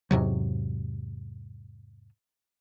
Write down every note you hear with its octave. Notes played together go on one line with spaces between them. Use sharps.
E2 G#2 C3 F#3